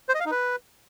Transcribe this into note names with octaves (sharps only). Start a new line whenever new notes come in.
C5
D#5
F5
D#4
B4